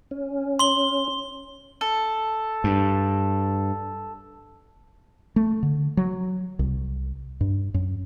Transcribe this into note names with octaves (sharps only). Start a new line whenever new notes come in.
C#4
C6 G7
A4
G2
A3
D3
F#3
C2
G2
F#2